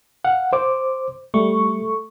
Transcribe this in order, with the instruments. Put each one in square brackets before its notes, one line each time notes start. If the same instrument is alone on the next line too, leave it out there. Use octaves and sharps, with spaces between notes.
[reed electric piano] F5 F#5
C5 D6
[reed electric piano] G3 [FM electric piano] A3 C#6